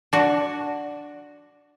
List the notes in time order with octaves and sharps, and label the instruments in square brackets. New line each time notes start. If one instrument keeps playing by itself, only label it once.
[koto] D4 F#4